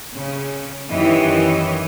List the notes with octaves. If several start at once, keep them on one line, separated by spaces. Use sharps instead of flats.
C#3
F#2 D#3 E3 G4 C#5 D#5